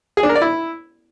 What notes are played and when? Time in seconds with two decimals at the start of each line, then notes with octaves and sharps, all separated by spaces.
0.17 G#4
0.23 D4
0.29 A#4
0.35 D5
0.42 E4